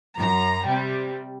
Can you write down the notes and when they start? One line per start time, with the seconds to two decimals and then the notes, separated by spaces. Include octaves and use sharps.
0.14 F#2 A#5
0.66 C3 G3